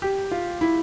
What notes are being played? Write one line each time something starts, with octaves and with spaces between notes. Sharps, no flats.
G4
F4
E4